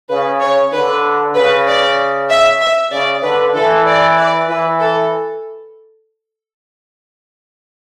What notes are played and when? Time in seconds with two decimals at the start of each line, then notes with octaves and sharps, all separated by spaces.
0.10 C#3 B4
0.41 C#5
0.72 D3 B4
1.35 C#3 B4
1.67 D5
2.30 E5
2.61 E5
2.92 C#3 D5
3.23 D3 B4
3.55 E3 A4
3.86 D5
4.17 D5
4.48 E3 B4
4.81 A4